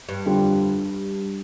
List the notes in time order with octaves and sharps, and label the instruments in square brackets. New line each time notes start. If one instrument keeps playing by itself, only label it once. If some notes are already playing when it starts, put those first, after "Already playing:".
[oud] G2
[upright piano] F2 D3 G3 D4 F4